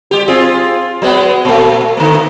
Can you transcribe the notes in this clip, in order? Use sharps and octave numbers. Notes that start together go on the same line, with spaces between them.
G3 G4
C4 F4 G#4
F#3 G#3 B3
A#2 A3
D3 A3